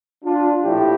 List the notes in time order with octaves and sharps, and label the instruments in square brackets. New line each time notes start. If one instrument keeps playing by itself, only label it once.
[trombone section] D4 F4
A#1 A2 E4 G4